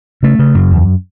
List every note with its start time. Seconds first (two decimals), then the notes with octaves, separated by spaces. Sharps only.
0.23 C#3 A3
0.39 C#3
0.55 F#2
0.71 E2